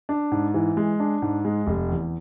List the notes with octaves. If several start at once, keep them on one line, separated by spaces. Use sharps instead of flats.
D4
G#2
E3
G#3
D4
G#2
G#3
F1
E2